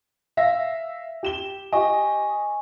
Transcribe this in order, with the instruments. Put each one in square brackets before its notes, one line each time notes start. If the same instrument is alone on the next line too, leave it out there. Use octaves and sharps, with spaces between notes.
[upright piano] E5 F5 A#6
G4 E7 G7
[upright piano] G4 D#5 [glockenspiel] G#5 C#6